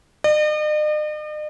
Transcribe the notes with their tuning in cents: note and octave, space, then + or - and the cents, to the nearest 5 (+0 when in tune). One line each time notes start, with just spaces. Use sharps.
D#5 -45